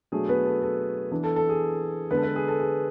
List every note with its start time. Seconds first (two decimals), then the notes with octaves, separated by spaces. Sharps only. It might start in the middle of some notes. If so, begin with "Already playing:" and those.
0.12 B2 F#3 A3 D4 G#4
0.29 B3 B4
0.45 A4
0.62 A4
1.11 E3 B3 D4
1.24 A4
1.36 A4
1.49 G#4
2.11 D3 G#3 B3 D4 B4
2.17 A4
2.23 B3 B4
2.36 G#4
2.48 A4
2.60 G#4